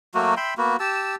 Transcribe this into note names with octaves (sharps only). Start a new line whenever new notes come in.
F#3 A3 A#3 F#4
E5 G5 B5 C6
A#3 B3 F#4
G4 A5 E6